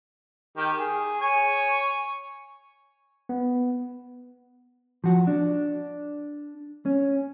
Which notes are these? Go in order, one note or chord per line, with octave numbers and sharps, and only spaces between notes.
D#3 G4
G#4
C#5 G#5
B3
F3 F#4
D4
C#4